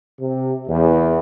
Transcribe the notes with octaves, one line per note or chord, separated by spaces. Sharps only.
C3
E2